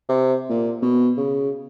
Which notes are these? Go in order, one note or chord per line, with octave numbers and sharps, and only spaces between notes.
C3
A#2
B2
C#3